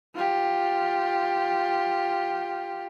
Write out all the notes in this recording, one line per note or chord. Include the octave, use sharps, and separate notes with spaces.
F4 G4